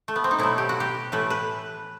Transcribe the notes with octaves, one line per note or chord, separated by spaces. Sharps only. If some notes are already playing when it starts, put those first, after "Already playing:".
A3
B3
C4
D#4
B2 F#3 A3 E4
G4
F#4
G4
A2 E3 A3 B4
B4